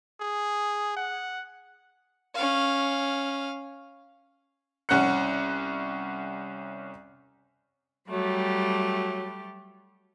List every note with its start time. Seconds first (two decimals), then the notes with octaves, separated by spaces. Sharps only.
0.20 G#4
0.97 F#5
2.35 C#4 F5
4.89 C2 C#4 F#5 F#6 C#7
8.08 F#3 G3 A3 G4